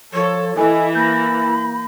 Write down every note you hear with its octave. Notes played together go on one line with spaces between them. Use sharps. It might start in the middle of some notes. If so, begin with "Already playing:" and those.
F3 A4 C#5
E3 E4 A4 D#5 G#5
A#3 B5 G6 A#6